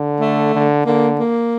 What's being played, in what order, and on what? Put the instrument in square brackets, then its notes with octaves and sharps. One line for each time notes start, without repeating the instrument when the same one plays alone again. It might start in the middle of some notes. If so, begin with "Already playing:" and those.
Already playing: [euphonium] D3
[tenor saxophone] A3
[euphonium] D3
[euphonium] D3 [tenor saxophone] A#3
[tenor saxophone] A#3